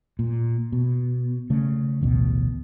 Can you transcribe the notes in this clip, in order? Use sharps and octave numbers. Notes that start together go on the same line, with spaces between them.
A#2
B2
C#3 A3
A1 D2 B2